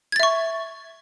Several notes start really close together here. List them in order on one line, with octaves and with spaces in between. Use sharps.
G#6 A6 E5 C#6